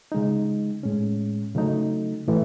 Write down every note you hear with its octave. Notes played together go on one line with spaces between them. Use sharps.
C#3 G#3 D#4
A2 G#3 C#4
C#3 F#3 A3 D#4
A2 E3 A3